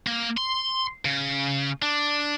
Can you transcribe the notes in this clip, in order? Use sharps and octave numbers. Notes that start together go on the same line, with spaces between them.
A#3
C6
C#3
D4